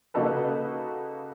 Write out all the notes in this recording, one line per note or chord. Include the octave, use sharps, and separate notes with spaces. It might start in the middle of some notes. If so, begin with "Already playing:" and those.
C#3 A#3 D#4 F#4 A4 B4